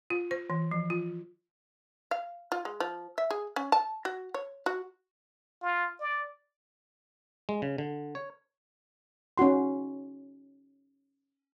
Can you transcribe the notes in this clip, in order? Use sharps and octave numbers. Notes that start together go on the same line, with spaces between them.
F4
C5
E3
F3
F4
F5
F4
G#3
F3
E5
G#4
C#4
A5
F#4
C#5
F#4
F4
D5
G#3
C#3
D3
C#5
C#4 D#4 F#4 C6